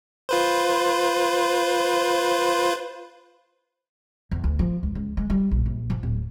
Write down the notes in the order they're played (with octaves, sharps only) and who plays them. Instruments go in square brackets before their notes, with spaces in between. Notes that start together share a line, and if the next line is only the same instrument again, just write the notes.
[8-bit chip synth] F4 B4 C5
[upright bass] E2
D2
F3
C#2
C#2
G#3
G3
A#1
A#1
F3
D1